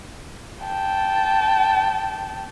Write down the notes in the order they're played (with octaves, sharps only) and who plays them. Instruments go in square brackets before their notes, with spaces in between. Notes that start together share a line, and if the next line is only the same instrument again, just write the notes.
[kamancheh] G5 A5